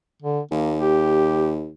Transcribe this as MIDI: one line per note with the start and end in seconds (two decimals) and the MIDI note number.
0.22 0.40 50
0.51 1.70 39
0.51 0.72 58
0.79 1.53 67